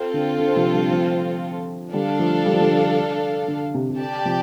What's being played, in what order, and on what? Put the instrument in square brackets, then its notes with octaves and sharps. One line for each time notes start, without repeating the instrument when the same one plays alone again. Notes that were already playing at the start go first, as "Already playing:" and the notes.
Already playing: [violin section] C4 F4 A4
[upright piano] D3
D3
C3 F3
D3 G3
F3 A3
[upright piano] D3 G3 [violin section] D4 A4 F5
[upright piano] F3 A3
G3
F3
D3 G3
D3
C3
C3
[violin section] G4 D5 A5
[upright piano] C3 F3